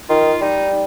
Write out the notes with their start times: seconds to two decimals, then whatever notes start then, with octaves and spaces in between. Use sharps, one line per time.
0.09 D#3 F4
0.41 G3 D#4